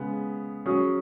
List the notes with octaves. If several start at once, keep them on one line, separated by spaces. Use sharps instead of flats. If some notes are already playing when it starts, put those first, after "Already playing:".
Already playing: C#3 G#3 B3
F#3 C#4 G#4